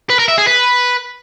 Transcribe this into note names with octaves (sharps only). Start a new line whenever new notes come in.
B4
A#4
E5
G#4
B4